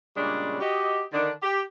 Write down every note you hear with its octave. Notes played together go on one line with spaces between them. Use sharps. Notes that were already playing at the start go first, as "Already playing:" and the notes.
A#2 C#3 G3 G#3 C#4 D4
F#4 G4 D#5
D3 D#3 D4
G4